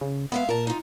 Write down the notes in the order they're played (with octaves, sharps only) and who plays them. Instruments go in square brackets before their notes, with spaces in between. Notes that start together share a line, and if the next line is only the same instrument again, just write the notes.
[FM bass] C#3
[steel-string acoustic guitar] G#3 E5 F5 [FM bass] B3
[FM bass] A#2 [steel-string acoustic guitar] A#4 A5
[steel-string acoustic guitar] D#4 F4